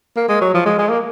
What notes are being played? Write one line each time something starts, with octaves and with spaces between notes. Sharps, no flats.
A#3
G#3
F#3
F3
G#3
G#3
A#3